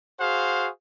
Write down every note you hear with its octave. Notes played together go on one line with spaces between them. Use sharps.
F#4 G#4 C5 F5